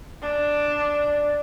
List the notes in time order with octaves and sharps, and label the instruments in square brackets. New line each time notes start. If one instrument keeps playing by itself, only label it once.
[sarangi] D4